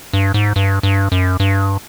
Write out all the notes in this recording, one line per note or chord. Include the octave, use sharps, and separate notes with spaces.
G2
G#2
G2
G2
F#2
G2